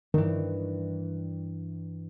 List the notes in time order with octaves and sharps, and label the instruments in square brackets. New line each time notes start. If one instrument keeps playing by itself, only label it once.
[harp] G2 E3 [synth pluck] D#3